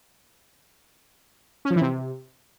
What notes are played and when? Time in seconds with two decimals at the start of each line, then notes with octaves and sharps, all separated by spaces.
1.65 C#4
1.70 F3
1.76 E3
1.81 C3